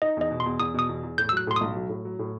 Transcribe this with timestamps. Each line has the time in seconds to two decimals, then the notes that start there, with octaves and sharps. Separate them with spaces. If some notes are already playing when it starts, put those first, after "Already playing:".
0.02 D#4 D#5
0.17 E2 D#5
0.31 B2
0.40 C6
0.46 E2
0.60 E2 D#6
0.74 B2 D#6
0.89 E2
1.03 E2
1.18 A2 G6
1.29 E6
1.32 F#3 F#6
1.47 A2 C6
1.56 B1 D#6
1.76 F#3
1.89 A2
2.05 F#3
2.19 A2